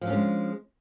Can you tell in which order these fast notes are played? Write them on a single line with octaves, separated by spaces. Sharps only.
F3 F#3 D4 C#4 G#3